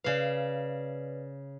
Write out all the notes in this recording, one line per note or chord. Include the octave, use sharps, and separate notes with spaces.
C#3 B4 D5 F5